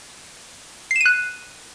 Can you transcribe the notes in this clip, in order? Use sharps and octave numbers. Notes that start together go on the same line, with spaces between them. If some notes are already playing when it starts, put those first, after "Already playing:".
F#6 C7 D#7 E7